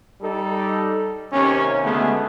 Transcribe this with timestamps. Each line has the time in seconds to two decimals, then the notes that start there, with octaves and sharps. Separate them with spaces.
0.21 G3 D#4 A4
1.31 D#2 C3 C#4
1.82 D2 G#3 A3 B3 G#4